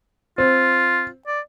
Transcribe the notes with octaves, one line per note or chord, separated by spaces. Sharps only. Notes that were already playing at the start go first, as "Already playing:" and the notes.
C4 F4
D5